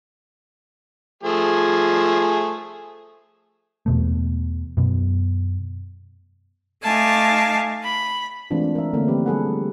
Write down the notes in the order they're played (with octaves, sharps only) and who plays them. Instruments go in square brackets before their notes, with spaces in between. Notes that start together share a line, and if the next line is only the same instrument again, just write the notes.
[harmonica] F3 A3 G#4
[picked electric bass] E2 B2 A3
F#2 B2
[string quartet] A3 D#4 F5 G#5 A5 D6
B5
[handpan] E3 G#3 A3 C4 D4 F4
A#4 E5
D3 A3 A#3 C4 C#4 E4
E3 F3 A#3 C4 G4 B4
G3 G#4 A4 B4 F#5